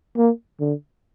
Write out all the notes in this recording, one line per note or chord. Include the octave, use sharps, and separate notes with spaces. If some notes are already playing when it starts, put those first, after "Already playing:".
A#3
D3